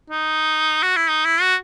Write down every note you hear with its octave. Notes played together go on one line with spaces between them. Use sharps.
D#4
F#4
E4
D#4
E4
F#4